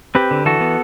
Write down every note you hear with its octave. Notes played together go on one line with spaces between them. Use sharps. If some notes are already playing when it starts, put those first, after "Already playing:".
C4 G4 B4
D3
E3 F#4 A4
B3